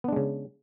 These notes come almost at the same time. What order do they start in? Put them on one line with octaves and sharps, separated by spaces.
B3 D4 G#3 C#3